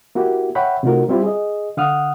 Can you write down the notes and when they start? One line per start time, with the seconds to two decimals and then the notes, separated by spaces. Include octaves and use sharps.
0.15 A#3 E4 F#4 G4
0.55 C#5 E5 F#5 G5 B5
0.83 C3 A3 D#4 F4 F#4 A#4
1.08 G3 C4 E4 F4 G4
1.23 G#4 D#5
1.77 D3 F5 F#5 D#6 F6